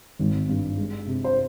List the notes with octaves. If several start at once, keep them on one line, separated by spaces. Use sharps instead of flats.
G#1
G2
G#3
C3
C5